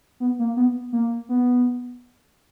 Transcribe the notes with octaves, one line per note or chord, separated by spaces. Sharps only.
B3
A#3
B3
A#3
B3